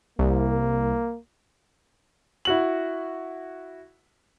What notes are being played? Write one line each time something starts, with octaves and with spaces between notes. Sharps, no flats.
C2 A#3
E4 F#4 F#7